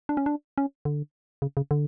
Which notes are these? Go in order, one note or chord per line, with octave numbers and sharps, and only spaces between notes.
D4
C#4
D4
C#4
D3
C#3
C#3
D3